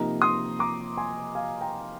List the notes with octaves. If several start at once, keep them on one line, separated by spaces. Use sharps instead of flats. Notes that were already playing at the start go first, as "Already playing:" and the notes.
Already playing: C3 F3 A#3 D#4 A#5
C6 D#6
A#5 D6
G#5 C6
F5 G#5
G5 A#5